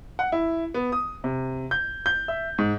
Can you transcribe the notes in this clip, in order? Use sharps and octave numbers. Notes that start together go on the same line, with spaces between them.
F#5
E4
B3
D#6
C3
G6
G6
E5
G#2